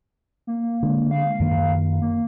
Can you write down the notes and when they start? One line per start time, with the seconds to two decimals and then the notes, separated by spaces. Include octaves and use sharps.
0.47 A#3
0.83 D3 G#3
1.11 F5
1.40 F#2 D#3 A#3
2.01 A#3